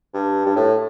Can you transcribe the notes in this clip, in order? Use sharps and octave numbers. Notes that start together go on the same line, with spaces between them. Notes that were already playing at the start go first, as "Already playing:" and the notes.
G2
G2
A2